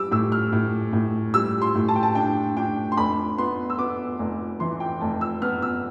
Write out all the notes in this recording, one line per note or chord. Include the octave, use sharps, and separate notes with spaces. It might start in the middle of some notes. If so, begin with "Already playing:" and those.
Already playing: G3 D6 E6
A2 E6
F6
A2
A2
G3 E6
C6
A2
A5
G5
A5
D4 G5
D4 G5
C6
F1 B5
B3 C6
E6
B3 D6
F1
E3 C6
G5
F1 A5
E6
B3 F6
E6